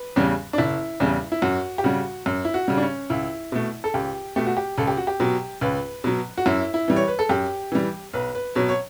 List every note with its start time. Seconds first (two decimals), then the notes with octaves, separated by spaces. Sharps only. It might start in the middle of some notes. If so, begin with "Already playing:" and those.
Already playing: B4
0.16 E2 C#3 G3
0.53 D4
0.58 F#1 E4
1.00 E2 C#3 G3
1.32 E4
1.42 F#2 F#4
1.78 G4
1.84 C#3 G3 F#4
2.26 F#2
2.45 E4
2.54 F#4
2.68 C#3 G3
2.77 D4
2.83 C#4
3.10 C#2 E4
3.52 B2 A3
3.84 A4
3.94 C#2 G4
4.36 B2 A3 G4
4.46 F#4
4.57 G4
4.78 C#2 A4
4.87 G4
4.97 F#4
5.07 G4
5.20 B2 F#3
5.61 C#2 B4
6.04 B2 F#3
6.38 F#4
6.46 F#2 E4
6.74 E4
6.88 E3 G3
6.96 C#5
7.08 B4
7.19 A4
7.29 F#2 G4
7.72 E3 G3
8.14 B1 B4
8.35 B4
8.55 B2 F#3 C#5
8.69 C#5